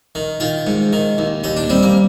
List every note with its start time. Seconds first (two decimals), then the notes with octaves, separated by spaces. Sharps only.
0.15 D#3
0.40 D#3 F4
0.67 G#2
0.93 D#3
1.18 D#2
1.44 D#2 D#4
1.57 D4
1.70 G3 C4
1.83 A#3